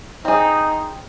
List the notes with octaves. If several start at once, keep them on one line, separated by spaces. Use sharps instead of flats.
C4 D#4 G#4